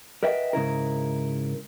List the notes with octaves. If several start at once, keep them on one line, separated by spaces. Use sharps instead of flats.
A#4 B4 D#5 E5 F#5 G5
G#2 C#3 E4 A#4